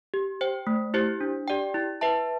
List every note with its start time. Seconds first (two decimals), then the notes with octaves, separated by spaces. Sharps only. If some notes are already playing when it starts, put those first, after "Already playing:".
0.14 G4
0.41 C5 G5
0.67 A3
0.94 E4 G4 C5
1.21 D4
1.48 G4 D5 G5
1.74 E4
2.01 B4 E5 A5